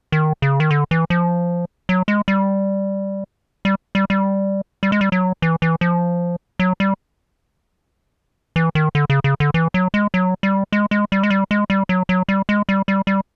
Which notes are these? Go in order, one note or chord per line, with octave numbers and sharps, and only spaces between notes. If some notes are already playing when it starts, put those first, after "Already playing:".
D#3
C#3
D#3
D3
E3
F3
F#3
G#3
G3
G3
G3
G3
G3
G#3
G3
F#3
E3
E3
F3
F#3
G3
E3
D#3
D3
C#3
C#3
D3
E3
F#3
G#3
F#3
G3
G#3
G#3
G3
G#3
G3
G#3
G3
F#3
F#3
G3
G#3
G3
G3
G3